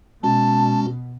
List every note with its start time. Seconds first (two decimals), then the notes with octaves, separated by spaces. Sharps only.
0.23 B2 G#3 C#4 F#4 A5